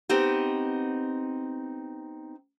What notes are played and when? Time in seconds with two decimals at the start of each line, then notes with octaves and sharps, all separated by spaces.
0.09 B3 C4 D#4 G4